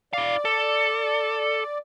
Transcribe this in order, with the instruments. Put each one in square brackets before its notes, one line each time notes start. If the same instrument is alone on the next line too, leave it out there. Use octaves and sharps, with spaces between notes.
[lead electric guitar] E4 F5 [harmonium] D5
[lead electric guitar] A4